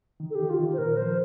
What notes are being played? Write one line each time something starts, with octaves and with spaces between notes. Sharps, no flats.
D#3
A4
D#3 G4
F4
D#3
C5
A#2 A#4
F3 C5